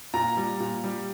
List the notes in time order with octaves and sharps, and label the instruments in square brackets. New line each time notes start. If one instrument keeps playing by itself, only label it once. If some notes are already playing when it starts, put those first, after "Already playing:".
[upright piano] A#2 A#5
G3
A#2
G3